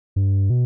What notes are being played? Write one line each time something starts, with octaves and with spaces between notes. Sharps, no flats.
G2
B2